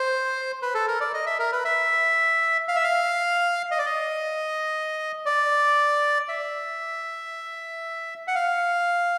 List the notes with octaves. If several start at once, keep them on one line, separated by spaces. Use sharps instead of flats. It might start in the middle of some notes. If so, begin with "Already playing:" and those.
Already playing: C5
B4
A4
A#4
D5
D#5
E5
A#4
B4
E5
F5
E5
F5
D#5
D5
D#5
D5
E5
F#5
F5